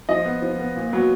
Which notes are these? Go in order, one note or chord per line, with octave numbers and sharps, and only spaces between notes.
F3 D#5
B3
F3
B3
A#2
F#3 B3